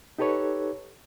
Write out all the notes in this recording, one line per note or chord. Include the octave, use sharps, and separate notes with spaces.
D#4 G4 A4 B4 C#5